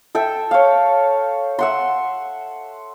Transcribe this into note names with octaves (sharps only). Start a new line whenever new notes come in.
A4 E5 G5
C#5 F5
E5 F#5 C6